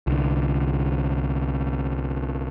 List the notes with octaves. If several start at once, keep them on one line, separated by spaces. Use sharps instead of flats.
C2 D3